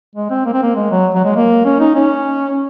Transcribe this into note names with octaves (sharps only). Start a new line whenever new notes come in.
G#3
C4
A#3
C4
A#3
G#3
F#3
F#3
G#3
A#3
C#4
D#4
C#4